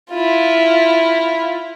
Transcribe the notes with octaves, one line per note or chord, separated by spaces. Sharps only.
E4 F4